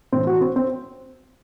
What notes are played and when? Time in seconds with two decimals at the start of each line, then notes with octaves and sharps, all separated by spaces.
0.12 A2 E3 C4
0.27 F#4
0.41 C4
0.56 C4